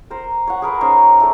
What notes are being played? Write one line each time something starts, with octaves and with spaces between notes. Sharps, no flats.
A#4 C5
C#5 F#5
G#4 A#4 B4
C#4 D#4 C5 C#5
A3 D5